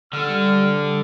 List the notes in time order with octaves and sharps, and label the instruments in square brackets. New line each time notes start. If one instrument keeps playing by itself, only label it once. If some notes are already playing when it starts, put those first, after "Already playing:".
[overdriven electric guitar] D3 [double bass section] G3 [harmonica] F6